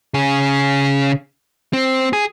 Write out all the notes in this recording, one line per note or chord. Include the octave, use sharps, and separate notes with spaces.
C#3 G#4
C4
G#4